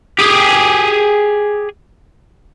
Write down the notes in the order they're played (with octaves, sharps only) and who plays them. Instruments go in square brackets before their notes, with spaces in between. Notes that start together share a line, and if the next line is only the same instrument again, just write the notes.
[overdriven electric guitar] G4 G#4